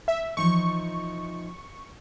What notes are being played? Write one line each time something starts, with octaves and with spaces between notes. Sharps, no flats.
E5
E3 F3 D#4 C#6